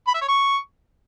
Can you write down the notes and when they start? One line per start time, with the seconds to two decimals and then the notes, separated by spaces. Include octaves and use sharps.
0.07 B5
0.14 E5
0.21 C#5
0.28 C#6